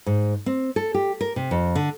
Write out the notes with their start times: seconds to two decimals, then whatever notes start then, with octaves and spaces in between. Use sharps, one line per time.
0.06 G#2
0.46 C4
0.76 A4
0.94 G4
1.21 A#4
1.36 C3
1.51 F2
1.75 D3